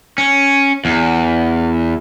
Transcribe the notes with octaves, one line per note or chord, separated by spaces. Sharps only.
C#4
E2